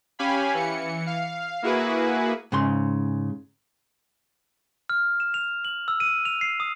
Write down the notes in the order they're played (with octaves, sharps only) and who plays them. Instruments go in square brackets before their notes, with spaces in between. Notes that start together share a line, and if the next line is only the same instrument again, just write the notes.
[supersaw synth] C#4 G4 F5 G#5 B5
E3 C#7
F5
A#3 E4 F#4 G#4 B4
[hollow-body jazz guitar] G#2 C#3 C6
[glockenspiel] F6
E7
F7
F#7
E6
D#7
F7
C7
D#6